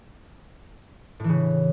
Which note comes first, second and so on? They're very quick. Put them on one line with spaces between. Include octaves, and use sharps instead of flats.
A2 E3 C#3